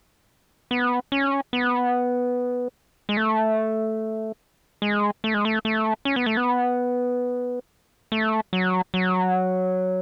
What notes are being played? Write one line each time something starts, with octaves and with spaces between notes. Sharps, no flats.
B3
C#4
B3
G#3
A3
G#3
A3
G#3
A3
A3
C#4
B3
A3
B3
A3
F#3
F#3